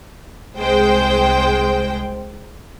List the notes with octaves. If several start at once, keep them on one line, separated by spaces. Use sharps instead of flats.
C2 G#3 C5 G5